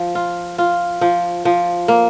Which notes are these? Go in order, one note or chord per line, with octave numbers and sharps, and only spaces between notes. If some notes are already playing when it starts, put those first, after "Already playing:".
Already playing: F3
F4
F4
F3
F3
A#3